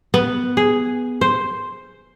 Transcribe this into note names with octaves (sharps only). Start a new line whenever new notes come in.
B3
G#4
C5